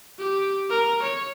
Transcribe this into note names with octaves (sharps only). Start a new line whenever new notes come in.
G4
A#4
C#5